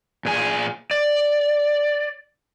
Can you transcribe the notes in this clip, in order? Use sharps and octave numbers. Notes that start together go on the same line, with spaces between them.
A#2 G#4 G#5
D5